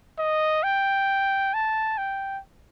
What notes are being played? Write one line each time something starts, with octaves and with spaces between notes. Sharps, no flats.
D#5
G5
A5
G5